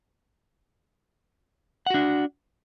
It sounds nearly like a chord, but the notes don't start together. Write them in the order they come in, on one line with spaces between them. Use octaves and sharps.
F#5 F#4 D4